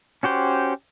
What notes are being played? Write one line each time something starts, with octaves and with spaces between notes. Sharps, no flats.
C#4 F#4 G4 C5